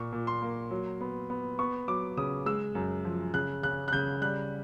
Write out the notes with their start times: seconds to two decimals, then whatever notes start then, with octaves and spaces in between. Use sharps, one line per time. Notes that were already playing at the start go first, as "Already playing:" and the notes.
Already playing: A#2 C#6
0.13 A#2
0.27 C6
0.42 A#3
0.71 F#3
1.01 B3
1.30 B3
1.59 B3 C#6
1.88 F#3 D6
2.17 C#3 D#6
2.46 G#3 E6
2.75 F#2
3.05 F3
3.34 C#3 F#6
3.63 C#3 F#6
3.88 F#6
3.93 C#3 G6
4.21 G3 F#6